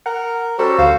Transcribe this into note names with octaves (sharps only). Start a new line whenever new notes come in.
A#4 F#5
G3 C#4 F#4 A4 C5
D2 C5 F5